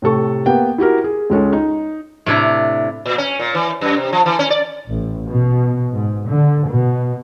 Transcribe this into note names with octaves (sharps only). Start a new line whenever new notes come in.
A2 C3 A4 C#6
A#3 B3 G4 F#5 G5
E4 F#4 G4 A#4
G#4
C#2 G#3 C#4 A4
D#4
A2 C3 D4 E4 A#5
A#2
C#4
A#2
E3
F#2
C3
F3
E3
C#4
D5
A1
B2
G#2
D3
B2